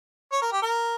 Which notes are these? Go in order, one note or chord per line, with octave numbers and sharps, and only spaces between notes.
C#5
A#4
G4
A#4